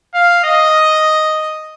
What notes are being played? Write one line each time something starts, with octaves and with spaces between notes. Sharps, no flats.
F5
D#5